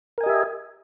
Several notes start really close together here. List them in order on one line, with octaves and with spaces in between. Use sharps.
A#4 G#5 D#5 G4 E5